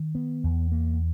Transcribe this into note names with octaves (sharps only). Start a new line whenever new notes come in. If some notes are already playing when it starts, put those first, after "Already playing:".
Already playing: D#3
B3
E2
A#3